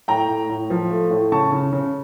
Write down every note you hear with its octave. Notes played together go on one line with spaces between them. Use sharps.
A2 G5 A#5
A2
A2
F3
A3
A2
C#3 A5 C#6
C#3
C#3